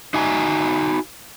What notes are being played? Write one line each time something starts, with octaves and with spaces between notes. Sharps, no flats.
D#4 F#4 E5 G#5 A#5